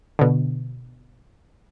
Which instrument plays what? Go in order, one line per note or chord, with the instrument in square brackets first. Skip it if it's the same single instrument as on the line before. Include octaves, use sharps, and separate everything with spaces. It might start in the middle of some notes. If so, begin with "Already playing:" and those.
[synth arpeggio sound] B2 D3